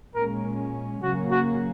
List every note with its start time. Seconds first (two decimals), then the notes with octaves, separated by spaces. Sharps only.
0.15 A#2 G#3 C#4 A#4
1.02 C#3 F#3 A#3 C#4 F#4
1.31 F#4